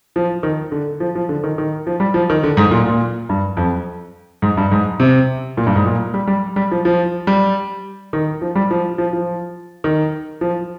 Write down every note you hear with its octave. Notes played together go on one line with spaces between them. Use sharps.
F3
D#3
D3
F3
F3
D3
D#3
D#3
F3
G3
F3
D#3
D3
G#2
A#2
A#2
G2
F2
G#2
G2
G#2
C3
A#2
G2
G#2
A#2
G3
G3
G3
F3
F3
G3
D#3
F3
G3
F3
F3
F3
D#3
F3